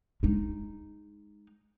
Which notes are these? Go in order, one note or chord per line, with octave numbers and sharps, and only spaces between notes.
G#3 D#4